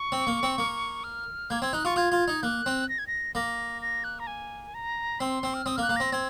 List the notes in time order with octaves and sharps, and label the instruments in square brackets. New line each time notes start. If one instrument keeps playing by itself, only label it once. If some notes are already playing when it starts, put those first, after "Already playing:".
Already playing: [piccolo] C#6
[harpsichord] C4
A#3
C4
A#3
[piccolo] F6
[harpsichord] A#3 [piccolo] G#6
[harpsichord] C4 [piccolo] G#6
[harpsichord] D#4 [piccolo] F#6
[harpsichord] F4 [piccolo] C#6
[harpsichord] F4 [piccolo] G#6
[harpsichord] F4
D#4
[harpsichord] A#3 [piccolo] F#6
[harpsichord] C4
[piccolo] A#6
G#6
A#6
[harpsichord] A#3 [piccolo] A#6
[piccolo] A#6
F#6
A#5
G#5
A#5
[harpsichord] C4 [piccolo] C6
[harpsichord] C4
[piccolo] F6
[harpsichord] C4 [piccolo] D#6
[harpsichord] A#3 [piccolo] F6
[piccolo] F#6
[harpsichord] A#3
[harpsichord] C4 [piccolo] A#6
[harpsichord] C4 [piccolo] G#6